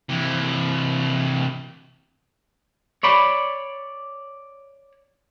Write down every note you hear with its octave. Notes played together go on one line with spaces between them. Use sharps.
C3 E3
C#5 D5 B5